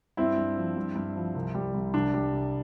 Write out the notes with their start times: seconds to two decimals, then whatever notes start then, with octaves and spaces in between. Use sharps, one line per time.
0.17 G2 C4 E4
0.38 G2
0.57 F3
0.77 G2
0.95 G2
1.16 F3
1.35 C2
1.54 G3
1.74 C2
1.94 C2 D4
2.14 G3
2.32 C2